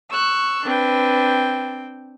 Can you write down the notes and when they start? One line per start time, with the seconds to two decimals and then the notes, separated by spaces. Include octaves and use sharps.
0.10 C#6 E6 F#6
0.65 C4 D4 B4 G5